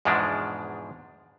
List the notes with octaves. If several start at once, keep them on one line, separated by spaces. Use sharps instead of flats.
E2 G#2 B2 F3 G#3 D4